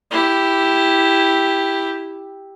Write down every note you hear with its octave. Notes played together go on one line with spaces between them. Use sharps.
E4 G4